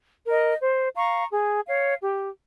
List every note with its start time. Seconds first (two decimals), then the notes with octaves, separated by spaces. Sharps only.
0.26 A#4 D#5
0.60 C5
0.96 F5 A#5 C#6
1.32 G#4
1.66 C#5 F5
2.02 G4